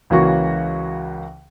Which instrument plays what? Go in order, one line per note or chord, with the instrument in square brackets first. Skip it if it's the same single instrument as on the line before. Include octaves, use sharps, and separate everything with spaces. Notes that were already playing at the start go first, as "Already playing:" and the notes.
[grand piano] C#2 C#3 E3 A#3 F#4 C#6